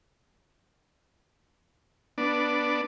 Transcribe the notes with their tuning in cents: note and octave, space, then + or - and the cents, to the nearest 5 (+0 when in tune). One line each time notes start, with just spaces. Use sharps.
B3 -10 D4 +0